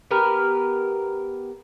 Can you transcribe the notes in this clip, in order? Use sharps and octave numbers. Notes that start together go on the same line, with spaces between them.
B3 G4 A#4 B4